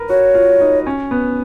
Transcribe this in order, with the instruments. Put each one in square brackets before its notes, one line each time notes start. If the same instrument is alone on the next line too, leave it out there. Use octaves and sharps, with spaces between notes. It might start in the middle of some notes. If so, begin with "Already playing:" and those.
Already playing: [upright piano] A#4 B4
[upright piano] F#4 [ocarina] C#5
[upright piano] F4
D#4
C#4
B3